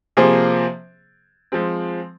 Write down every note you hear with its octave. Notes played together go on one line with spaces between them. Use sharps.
C3 F3 A#3 G#4 C5
F3 G#3 C4